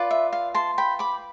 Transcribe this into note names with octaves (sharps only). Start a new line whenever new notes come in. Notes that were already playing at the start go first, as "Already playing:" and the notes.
Already playing: F4 B4 D5
E5
F5
A5 C6
G5 B5
B5 D6